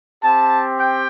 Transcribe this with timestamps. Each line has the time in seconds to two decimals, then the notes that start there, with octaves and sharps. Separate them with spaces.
0.24 C4 G4 A5
0.79 G5